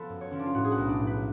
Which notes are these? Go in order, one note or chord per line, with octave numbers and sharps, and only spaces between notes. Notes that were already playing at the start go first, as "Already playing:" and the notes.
Already playing: F3 B3 A4 B4
F#2
C#5
F3 C#4
D4
F4
A2 F#4
G#4
F#4
B1
D4
A2
B4